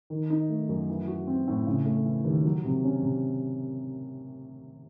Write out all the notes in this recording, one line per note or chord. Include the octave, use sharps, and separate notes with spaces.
D#3
D#4
A3
F#2
E3
F#4
C4
A2
C#3
A3
E3
D#2
F#3
C3
C#4
C3